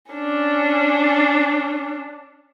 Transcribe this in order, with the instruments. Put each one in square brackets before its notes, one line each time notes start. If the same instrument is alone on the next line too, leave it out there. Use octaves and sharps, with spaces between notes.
[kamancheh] C#4 D4